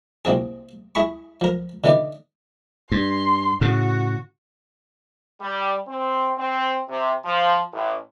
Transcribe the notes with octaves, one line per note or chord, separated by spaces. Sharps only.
C2 A#3 C4 G#4
E4 G#4 B5 C#6
F3 A#4
D3 E3 B3 D#4 D5
G2 C6
A2 C#3 F#4
G3
C4
C4
C3
F3
A1